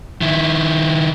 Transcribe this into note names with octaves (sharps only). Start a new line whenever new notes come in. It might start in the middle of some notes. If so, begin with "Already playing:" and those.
D#3 E4